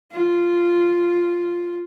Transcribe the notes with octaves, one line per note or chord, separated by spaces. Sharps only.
F4